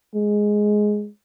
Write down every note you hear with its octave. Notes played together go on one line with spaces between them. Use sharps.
G#3